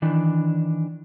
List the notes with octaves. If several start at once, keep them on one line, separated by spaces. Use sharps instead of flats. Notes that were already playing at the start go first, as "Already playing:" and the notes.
D#3 E3 D4